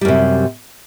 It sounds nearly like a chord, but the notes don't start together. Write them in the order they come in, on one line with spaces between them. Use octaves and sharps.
G3 F#2 C3